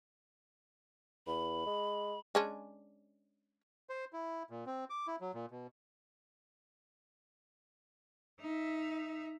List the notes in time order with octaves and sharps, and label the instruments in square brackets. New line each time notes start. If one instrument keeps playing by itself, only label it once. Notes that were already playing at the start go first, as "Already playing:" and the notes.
[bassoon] E2 [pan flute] B5
[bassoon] G#3
[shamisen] G#3 C#4 D4
[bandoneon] C5
E4
A#2
C4
D6
E4
F#3
A#2
B2
[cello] D#4 E5